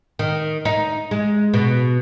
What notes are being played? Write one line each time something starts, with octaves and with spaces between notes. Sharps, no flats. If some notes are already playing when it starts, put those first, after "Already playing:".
D#3
D#4
G#3
B2